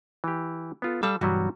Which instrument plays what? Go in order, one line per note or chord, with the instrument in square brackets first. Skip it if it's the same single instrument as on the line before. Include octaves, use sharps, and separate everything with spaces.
[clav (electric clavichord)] E3 G4
B3 F4 A4
[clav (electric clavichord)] G3 [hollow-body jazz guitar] A4 F5
[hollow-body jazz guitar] B1 G2 E3 [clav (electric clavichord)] F#3 G3 F#4